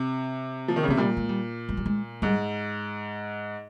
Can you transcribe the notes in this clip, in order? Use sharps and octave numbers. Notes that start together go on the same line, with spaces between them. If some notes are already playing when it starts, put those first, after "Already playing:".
Already playing: C3
F3
D#3
C#3
C3 F3
A#2 G3
G#3
G3
G#3
G3
G#3
G#2 G3